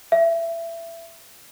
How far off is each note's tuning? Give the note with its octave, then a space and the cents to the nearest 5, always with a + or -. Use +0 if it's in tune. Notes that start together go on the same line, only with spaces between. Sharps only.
E5 +20